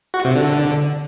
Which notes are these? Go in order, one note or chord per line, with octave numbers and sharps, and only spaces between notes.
F#4
C3
D3